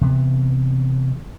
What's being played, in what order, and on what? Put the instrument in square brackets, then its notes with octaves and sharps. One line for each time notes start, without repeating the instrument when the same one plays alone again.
[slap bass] C3 E3 B3